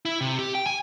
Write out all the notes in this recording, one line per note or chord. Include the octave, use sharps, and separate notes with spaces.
E4
C3
G4
G5
G#5